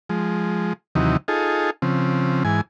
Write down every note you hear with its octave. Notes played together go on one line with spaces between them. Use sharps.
F3 G#3
D#2 C3 E3 F#3 D#4
D#4 F4 G#4 A4
C#3 F3 C4
G#2 E3 G#5